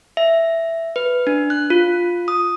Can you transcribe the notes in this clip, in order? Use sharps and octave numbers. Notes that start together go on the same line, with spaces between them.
E5
B4
D4
F#6
F4
D#6